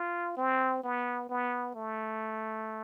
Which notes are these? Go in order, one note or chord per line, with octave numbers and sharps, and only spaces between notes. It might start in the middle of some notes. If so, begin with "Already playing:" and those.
Already playing: F4
C4
B3
B3
A3